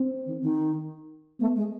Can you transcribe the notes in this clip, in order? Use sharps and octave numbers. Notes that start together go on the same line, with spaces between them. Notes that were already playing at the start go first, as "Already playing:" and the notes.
Already playing: C4
D#3
D#3
A3 B3
G#3